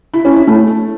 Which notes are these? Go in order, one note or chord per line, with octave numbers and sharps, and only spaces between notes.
E4
C#4
E4
A3